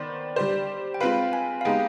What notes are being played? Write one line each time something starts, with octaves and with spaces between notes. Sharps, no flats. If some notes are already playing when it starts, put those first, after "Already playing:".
Already playing: D#3 B3 C5 D5
G3 D4 G4 C5
G5
G#3 C4 F4 B4 F5
G#5
F5
G#3 B3 D#4 G4 G5